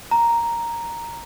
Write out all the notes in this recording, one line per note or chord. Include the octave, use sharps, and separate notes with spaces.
A#5